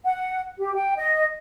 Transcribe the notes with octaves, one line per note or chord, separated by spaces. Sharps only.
F#5
G4
G5
D#5